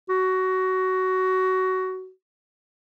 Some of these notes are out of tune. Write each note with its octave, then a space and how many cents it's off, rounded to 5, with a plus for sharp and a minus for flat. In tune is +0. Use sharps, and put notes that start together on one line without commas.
F#4 +15